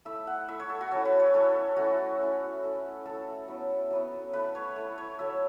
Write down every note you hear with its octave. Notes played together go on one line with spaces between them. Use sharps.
A3 E4 E5
F#5
A3 E4 E5
C#5
A4
F#4
F#3 C#4 E4 A4
B4
C#5
F#3 C#4 E4 A4
A3 C#4 E4 F#4
A3 C#4 E4
A3 E4
A3 E4 A4
F#3 B3 E4
F#3 B3 E4
A3 E4 B4
C#5
A3 E4
C#5
F#3 A3 E4 E5